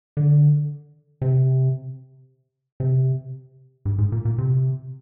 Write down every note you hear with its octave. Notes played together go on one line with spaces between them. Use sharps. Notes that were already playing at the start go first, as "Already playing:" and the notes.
D3
C3
C3
G2
G#2
A#2
A#2
C3